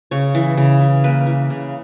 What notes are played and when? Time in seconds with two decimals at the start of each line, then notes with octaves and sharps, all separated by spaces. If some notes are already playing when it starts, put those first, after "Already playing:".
0.11 C#3 C#5
0.35 E3
0.57 C#3
0.81 E3
1.04 A#3 B4
1.26 E3
1.50 C#3